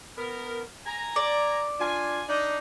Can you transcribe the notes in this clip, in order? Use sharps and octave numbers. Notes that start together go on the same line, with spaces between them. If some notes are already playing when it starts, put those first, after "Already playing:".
B3 A#4
G#5 A#5
D5
D4 F4 G#5
D4 D#4